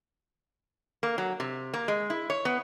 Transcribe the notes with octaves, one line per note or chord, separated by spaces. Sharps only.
A#3
F#3
C3
A#3
G#3
E4
C#5
B3